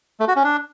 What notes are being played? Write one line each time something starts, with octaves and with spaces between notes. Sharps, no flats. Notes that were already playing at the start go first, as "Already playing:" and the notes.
A3
F#4
C#4
D4